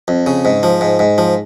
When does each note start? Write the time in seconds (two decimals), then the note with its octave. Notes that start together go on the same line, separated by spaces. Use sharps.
0.08 F2
0.26 C#3
0.45 G#2
0.63 F3
0.81 G#2
0.99 G#2
1.18 F3